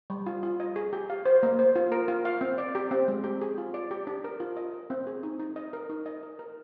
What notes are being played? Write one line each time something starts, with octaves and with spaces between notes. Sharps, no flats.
G3
F4
F4
D#5
G#4
G4
F5
C5
A#3
C5
F4
A#4
F4
F5
C4
D5
G4
C4
G#3
G4
G#4
F4
D5
G4
D4
A#4
F4
D#5
A#4
C4
G#4
D#4
D#4
D#5
A#4
D#4
D#5
A#4
A#4